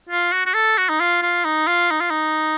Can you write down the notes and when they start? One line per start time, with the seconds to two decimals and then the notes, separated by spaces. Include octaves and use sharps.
0.09 F4
0.32 F#4
0.46 F#4
0.54 A4
0.78 F#4
0.89 D#4
1.00 F4
1.22 F4
1.45 D#4
1.67 F4
1.91 D#4
2.00 F4
2.10 D#4